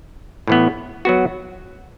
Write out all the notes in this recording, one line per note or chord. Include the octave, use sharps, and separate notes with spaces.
A2 E3 B3
F#3 B3 F#4